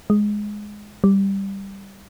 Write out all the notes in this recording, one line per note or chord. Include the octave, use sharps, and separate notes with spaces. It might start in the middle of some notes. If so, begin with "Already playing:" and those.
G#3
G3